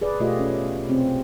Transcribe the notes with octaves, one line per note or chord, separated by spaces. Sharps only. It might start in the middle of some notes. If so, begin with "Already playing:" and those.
G#4 B4 D5
B2 A3 F4 G4 D#5
C#4
C3 C4